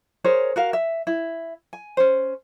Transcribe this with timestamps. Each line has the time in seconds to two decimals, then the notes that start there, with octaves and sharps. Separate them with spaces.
0.24 G#4 A#4 C5 C#5
0.56 F#4 A#4 F5
0.73 E5
1.07 E4
1.73 G#5
1.97 C#4 C5